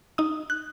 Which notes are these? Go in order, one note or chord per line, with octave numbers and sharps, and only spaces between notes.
D#4 D#6
F#6